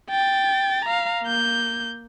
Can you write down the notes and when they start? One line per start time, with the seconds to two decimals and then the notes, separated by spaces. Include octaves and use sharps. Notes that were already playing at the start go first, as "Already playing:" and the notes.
0.10 G5 A6
0.85 F5 A#5
1.23 A#3 G6